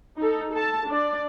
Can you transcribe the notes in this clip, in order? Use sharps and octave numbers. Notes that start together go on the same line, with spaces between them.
D#4 A4
A4 A5
D4 D5